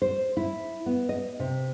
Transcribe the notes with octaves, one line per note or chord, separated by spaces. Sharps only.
C5
E4
B3
D#5
C3